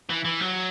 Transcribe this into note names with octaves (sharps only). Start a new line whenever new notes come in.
E3
E3
F#3